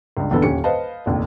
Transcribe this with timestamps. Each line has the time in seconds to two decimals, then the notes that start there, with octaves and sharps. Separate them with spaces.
0.17 C#2 G2
0.31 A#1 E2 D3 B3 A4
0.42 D#1 C#4 G4 C#7
0.64 B4 C5 D#5 F5 A5
1.06 F1 A#1 D#2